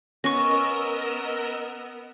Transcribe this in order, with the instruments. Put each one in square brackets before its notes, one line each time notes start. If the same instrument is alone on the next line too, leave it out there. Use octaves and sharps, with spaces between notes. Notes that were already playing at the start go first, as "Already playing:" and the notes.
[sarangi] B3 [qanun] C#4 [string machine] A#4 D#5 E6 [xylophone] C#6 A#6